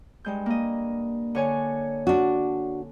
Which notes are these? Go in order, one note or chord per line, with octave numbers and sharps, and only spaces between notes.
G2 G#3 G6
A#3 D#5
D3 C#5 G#5
D4 F#4